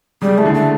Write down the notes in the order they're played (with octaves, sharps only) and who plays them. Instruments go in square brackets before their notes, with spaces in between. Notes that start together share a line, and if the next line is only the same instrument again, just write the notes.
[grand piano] C#3 [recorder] G3
[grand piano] E3 [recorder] A3
[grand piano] D3
[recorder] A3